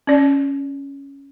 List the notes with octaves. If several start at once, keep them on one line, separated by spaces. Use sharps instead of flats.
C#4 D5